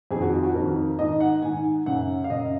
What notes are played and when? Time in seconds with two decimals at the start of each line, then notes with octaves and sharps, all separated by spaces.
0.11 F2 G#4
0.15 D#3
0.22 F#4
0.33 F4
0.44 F#4
0.54 F2 D#3 A#4
0.99 G#2 D#3 D#5
1.20 F#5
1.42 G#2 D#3 G#5
1.86 F#2 C#3 F#5
2.24 F5
2.30 F#2 C#3 D#5